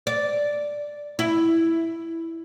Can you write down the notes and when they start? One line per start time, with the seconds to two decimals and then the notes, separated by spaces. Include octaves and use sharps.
0.07 D5
1.19 E4